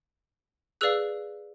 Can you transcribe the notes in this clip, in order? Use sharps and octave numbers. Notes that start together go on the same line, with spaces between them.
G#4 B4 D5 F5 E6 F#6